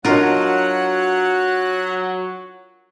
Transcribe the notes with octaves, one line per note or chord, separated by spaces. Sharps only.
F#3 D4 F4 F#4 A#4 D#5 F#5 F#6